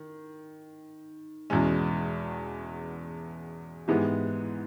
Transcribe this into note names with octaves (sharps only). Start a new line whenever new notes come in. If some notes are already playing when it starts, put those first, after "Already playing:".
Already playing: D#3
E2 B2 G#3 C#4
G#2 E3 G#3 B3 G4